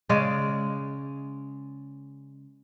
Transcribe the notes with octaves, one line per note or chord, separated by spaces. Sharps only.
C#3 G#3 C#4 D5